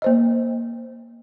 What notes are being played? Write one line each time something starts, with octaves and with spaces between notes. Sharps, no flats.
A#3 C5 D#5